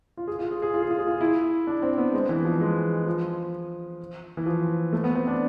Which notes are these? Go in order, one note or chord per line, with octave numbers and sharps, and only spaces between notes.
F4
G#4
F4
G#4
G#4
F4
G#4
F4
G#4
F4
E4
D4
C4
B3
G#3
E3
F3
G#3
F3
E3
F3
A3
B3
C4
D4